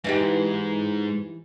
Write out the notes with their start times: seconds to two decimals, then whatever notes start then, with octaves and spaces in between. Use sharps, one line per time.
0.04 G#2 E3 D#4 G4